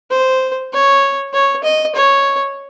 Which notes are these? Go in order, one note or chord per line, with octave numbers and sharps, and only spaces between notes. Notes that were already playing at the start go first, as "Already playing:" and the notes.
C5
C#5
C#5
D#5
C#5